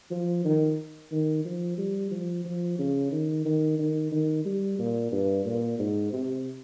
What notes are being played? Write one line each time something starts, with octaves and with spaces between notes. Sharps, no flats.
F3
D#3
D#3
F3
G3
F3
F3
C#3
D#3
D#3
D#3
D#3
G3
A#2
G2
A#2
G#2
C3